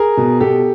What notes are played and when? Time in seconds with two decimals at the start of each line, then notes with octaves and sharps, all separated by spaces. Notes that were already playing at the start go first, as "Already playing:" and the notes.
Already playing: G#4 A#4
0.17 B2
0.40 B2 G4 A4